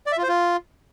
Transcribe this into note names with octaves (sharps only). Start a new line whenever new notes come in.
D5
E5
F4
C5
F4